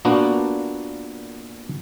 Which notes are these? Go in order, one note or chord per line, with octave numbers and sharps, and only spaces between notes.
A#2 A#3 B3 D4 F#4